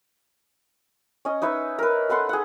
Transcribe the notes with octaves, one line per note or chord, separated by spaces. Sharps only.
C#4 D#5
D#4 B4 C#5 E5
A#4 B4
A4 B4 F#5 C6
G#4 F#5